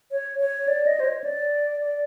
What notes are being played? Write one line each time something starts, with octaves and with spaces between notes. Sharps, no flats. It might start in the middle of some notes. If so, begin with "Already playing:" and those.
C#5
C#5
D5
D#5
C5
C#5
D5
D5